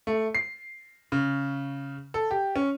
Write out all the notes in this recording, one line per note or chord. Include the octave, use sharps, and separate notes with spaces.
A3
C7
C#3
A4
G4
C#4